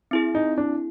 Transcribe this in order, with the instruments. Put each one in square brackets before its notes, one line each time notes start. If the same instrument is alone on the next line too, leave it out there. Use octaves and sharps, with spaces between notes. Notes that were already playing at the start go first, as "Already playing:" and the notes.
[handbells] C4 E4 G#4
[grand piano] D#4
D4